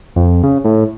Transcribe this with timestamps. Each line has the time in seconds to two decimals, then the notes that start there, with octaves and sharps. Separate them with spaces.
0.16 F2
0.43 C#3
0.64 A2